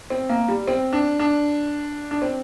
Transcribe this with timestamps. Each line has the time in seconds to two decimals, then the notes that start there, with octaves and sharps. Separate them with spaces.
0.10 C4
0.29 A#3
0.48 G3
0.67 C4
0.93 D4
1.19 D4
2.11 D4
2.22 C4